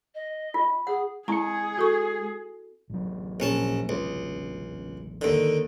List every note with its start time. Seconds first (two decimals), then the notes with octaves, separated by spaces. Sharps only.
0.15 D#5
0.54 F4
0.87 G#4 F#5
1.28 G#3 C4 E4 G#4 A#5 C#7
1.77 F#4 A4 C#6
2.90 A1 F#3
3.40 A#1 C#4 A5
3.89 C#2
5.21 D#2 D3